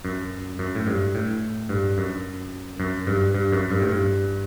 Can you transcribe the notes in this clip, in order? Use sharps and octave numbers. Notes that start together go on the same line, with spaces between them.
F#2
F#2
A2
G2
A2
G2
F#2
F#2
G2
G2
F#2
G2
A2
G2